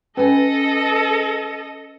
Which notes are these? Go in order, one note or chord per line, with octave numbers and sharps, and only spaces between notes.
C#4 A4 B4 D#5 G#5